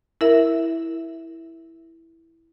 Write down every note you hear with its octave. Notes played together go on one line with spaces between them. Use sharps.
E4 A#4 E5